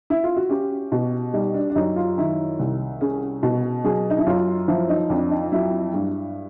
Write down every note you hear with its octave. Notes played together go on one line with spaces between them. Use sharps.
E4
F4
F#4
C#4 G4
B2
G3 D#4
D4
D4
F#2 D#4
F4
D#3 E4
C2
C#4 G#4
B2
F#3 G#4
D#4
E4
F#2 F4
F3 E4
D#4
F2 D4
D#4
F#3 E4
G2